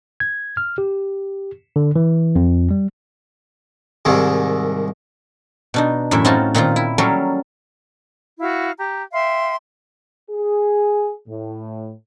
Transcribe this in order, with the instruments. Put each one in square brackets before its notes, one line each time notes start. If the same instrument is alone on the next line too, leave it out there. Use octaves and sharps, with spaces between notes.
[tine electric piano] G#6
F6
G4
D3
E3
F2
G3
[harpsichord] C2 G#2 D#3
[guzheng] B2 D4 D#4
F#2 A2 E3 E5
C4 C#4 D#4 F4 F#4 A5
A#2 D#3 C4 F4
E4
F#3 G3 C#4 A4 A#4
[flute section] E4 F#4 F5
G4 A#5
E5 F5 G5 C6
[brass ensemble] G#4
A2